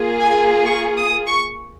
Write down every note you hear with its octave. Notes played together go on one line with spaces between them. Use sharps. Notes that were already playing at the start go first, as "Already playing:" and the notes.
Already playing: A#3 F4 G#4
G#5
C#6
D#6
C#6